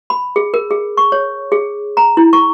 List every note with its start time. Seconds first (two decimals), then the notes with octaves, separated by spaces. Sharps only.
0.10 B5
0.36 G#4
0.54 A#4
0.71 G#4
0.97 C#6
1.12 C#5
1.52 G#4
1.97 A#5
2.17 E4
2.33 C#6